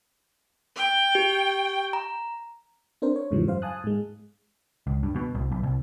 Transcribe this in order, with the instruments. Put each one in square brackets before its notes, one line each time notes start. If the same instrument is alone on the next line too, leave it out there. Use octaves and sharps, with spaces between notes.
[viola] G5
[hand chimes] G4
A#5
[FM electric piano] C4 D4 A#4 C5
C#5
E2 G#2 C#3 E3 F3 G3
F#2 C5 F5
F5 G#5 A5 D#6 F#6
G#2 G#3
[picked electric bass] C#2
G2
B2
C2
B1
C2